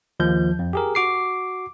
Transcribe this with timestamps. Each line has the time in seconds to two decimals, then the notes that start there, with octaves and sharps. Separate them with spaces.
0.20 D#2 F3 G6
0.59 F2
0.73 G4 G#4 A#4
0.95 F#4 D6 C7